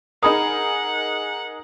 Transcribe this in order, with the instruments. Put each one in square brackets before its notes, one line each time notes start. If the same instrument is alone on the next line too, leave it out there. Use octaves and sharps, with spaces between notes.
[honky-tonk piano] D#4 G#4 A#4 [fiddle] F#5 [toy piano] A#5 B5 D#6